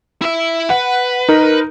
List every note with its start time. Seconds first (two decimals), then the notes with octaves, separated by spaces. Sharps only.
0.21 E4 E5
0.70 B4 F#5
1.29 D#4 A#4